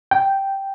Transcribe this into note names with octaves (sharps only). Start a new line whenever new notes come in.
G5